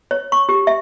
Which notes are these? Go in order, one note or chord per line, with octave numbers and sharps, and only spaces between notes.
C#5
C#6
G4
E5